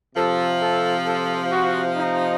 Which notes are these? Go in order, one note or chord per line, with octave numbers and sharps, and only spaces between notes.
C3 F3 A4
A4
A4
F#4
D#4